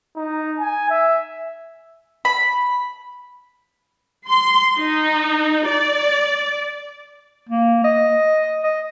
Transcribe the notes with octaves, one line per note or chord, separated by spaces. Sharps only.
D#4
G#5
E5
B5
C6
D#4
D5
A#3
D#5
D#5